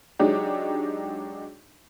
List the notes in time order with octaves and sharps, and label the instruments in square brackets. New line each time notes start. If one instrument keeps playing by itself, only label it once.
[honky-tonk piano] F#3 G#3 D4 D#4 G4